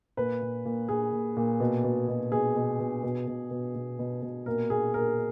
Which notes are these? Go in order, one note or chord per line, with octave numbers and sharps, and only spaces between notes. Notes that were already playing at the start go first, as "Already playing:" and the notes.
A#2 B4
A#2
A#2
A#2 G#4
A#2
A#2
B2
B2
B2
B2 G#4
B2
B2
B2
B2
B2
B2
B2
B2
A#2 A#4
A#2 G#4
A#2 A#4